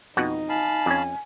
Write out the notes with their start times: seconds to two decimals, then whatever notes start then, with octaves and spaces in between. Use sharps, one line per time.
0.17 F2 B2 D#4 F#5
0.49 F5 G#5 A5 B5
0.86 F2 C#4